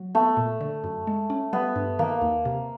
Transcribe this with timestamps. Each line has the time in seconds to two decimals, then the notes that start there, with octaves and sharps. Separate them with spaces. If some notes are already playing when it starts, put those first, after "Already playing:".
Already playing: F#3
0.15 A3 B3
0.37 A#2
0.61 D3
0.84 F#2
1.07 G#3
1.30 C#4
1.53 G3 B3
1.76 G2
1.99 D#3 A#3
2.22 D#2
2.45 C3